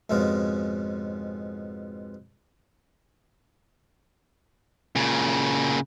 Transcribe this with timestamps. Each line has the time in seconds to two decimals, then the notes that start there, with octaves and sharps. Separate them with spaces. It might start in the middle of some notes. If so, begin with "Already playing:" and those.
0.10 F2 G#2 B2 G#3 C#4 F5
4.95 A#2 C#3